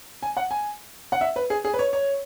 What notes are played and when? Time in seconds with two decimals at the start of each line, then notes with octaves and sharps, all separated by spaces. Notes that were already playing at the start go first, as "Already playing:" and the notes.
0.23 G#5
0.37 F#5
0.51 G#5
1.12 F#5
1.21 E5
1.36 B4
1.50 G#4
1.64 G#4
1.74 B4
1.79 C#5
1.93 C#5